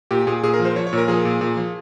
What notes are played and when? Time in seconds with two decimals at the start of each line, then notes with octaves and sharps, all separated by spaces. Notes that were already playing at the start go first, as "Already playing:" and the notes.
0.11 A#2 G4
0.27 A#2 G#4
0.43 A#2 G#4
0.54 A#4
0.60 F3
0.65 C5
0.76 F3 C#5
0.87 C#5
0.93 A#2
0.98 A#4
1.08 F3 G#4
1.25 A#2
1.41 A#2
1.57 F3